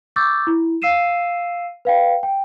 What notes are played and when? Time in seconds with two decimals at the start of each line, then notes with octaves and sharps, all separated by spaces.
0.16 C#6 D6 E6 G6 A6
0.47 E4
0.82 F5 E6 C7 D#7 E7
1.85 B4 F5 G5
2.23 G5